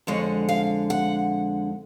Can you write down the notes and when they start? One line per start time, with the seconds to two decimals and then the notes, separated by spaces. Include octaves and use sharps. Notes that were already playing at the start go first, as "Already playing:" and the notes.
0.07 F2 D3 G#3 C#5
0.49 F5
0.90 F#5